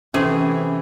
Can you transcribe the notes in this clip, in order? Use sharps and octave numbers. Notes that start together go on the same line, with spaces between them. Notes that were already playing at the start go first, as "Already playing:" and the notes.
C3 E3 A3 C#4 G#4